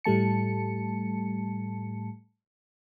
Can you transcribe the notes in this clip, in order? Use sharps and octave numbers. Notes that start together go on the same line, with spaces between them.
A2 G3 A3 A5 C#7